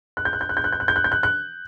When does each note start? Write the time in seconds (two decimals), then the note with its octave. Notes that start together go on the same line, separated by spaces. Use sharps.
0.17 F#6
0.25 G6
0.33 F#6
0.41 G6
0.49 F#6
0.57 G6
0.64 F#6
0.72 G6
0.80 F#6
0.88 G6
0.96 F#6
1.04 G6
1.12 F#6
1.23 F#6